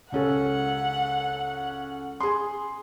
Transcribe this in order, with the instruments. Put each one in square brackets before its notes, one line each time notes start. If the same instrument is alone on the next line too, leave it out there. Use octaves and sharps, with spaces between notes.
[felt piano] C#2 C#4 A4 [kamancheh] F#5
[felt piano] G#4 C6